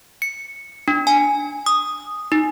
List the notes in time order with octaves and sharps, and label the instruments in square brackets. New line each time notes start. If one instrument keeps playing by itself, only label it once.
[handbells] C#7
D4
G#5
D#6
D#4